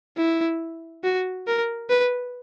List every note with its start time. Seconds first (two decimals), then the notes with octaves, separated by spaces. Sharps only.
0.17 E4
1.04 F#4
1.47 A#4
1.90 B4